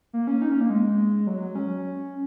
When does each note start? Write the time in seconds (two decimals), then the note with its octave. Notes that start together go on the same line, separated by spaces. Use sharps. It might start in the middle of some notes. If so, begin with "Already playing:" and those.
0.13 A#3
0.27 C#4
0.42 D#4
0.52 C#4
0.61 A#3
0.70 G#3
1.27 F#3
1.55 C#4